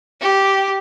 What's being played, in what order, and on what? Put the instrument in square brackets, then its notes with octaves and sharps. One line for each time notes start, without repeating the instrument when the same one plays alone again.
[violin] G4